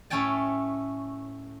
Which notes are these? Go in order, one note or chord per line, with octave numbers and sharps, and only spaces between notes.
A2 A3 C#4 C#5 G5 A5